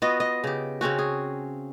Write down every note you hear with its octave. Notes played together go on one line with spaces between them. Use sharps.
B3 F4 F#4 D#5
D#5
C#3 G4
C#3 C4 C#4 F#4
G#4